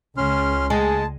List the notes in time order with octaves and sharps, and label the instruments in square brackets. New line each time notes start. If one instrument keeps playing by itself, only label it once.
[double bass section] C#2 [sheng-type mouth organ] C#4 C6 F6
[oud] G#3 [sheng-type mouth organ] A5